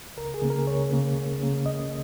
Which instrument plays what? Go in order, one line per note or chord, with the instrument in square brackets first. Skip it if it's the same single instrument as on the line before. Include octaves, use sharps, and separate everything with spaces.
[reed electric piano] C#2 A#4
G#4
C#3 A#3
A#4
C#2 C#5
C#3 A#3
C#2
C#3 A#3
C#2 D#5